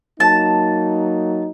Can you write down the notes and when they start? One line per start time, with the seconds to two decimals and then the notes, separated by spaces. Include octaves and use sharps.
0.20 F#3 A#3 D#4 A5